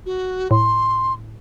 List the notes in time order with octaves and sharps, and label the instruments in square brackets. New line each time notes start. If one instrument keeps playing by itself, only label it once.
[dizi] F#4
[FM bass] A2 [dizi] C6